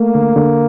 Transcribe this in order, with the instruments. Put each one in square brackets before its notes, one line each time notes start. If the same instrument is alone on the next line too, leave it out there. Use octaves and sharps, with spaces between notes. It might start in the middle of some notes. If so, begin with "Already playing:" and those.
Already playing: [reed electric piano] A3 [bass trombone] A#3
[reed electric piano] D3
D3